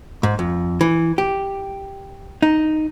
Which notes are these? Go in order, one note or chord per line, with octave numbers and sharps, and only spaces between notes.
G#2
F2
E3
G4
D#4